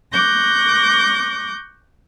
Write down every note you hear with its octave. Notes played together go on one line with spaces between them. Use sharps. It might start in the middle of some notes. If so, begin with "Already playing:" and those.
C#6 D6 F#6 G6 A#6